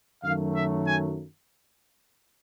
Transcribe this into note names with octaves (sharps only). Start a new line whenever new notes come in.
F#2 D#3 F#3 A3 F5
E5
G#5